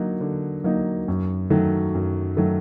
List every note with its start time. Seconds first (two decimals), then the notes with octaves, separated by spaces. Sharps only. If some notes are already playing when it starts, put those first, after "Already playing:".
Already playing: D3 F#3 A#3 D#4
0.21 D3
0.64 F#3 A#3 D#4
1.08 F#2
1.50 D#3 F#3 A3
1.95 F#2
2.37 D#3 F#3 A3